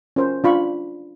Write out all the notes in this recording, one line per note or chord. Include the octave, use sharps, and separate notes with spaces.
C#4 F4 A#4 C5
D4 F4 B5 C#6